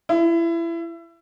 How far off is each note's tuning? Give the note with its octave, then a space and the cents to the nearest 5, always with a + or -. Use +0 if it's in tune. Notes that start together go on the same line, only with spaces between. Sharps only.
E4 +25